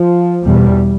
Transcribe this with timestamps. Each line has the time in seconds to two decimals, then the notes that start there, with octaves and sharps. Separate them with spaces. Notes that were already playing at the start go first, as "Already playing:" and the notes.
Already playing: F3
0.44 E2 B2 G3